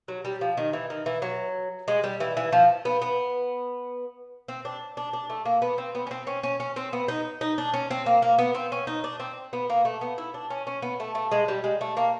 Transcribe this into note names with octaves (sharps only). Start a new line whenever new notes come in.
F#3
G3
F3
D#3
E3
D#3
E3
F#3
G#3
G3
E3
E3
F3
B3
B3
C4
D4
D4
D4
A3
A#3
B3
C4
B3
C#4
C4
C#4
C#4
C#4
C4
B3
D#4
D#4
D4
C#4
C4
A#3
A#3
B3
C4
C#4
D#4
D4
C4
B3
A#3
A3
B3
E4
D4
C#4
C#4
B3
A3
A3
G#3
G3
G#3
A3
A#3